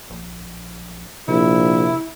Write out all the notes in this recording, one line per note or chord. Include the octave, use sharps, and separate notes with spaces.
A#1
A#1 C3 E4